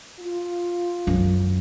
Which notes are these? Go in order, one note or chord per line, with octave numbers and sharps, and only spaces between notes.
F4
F#2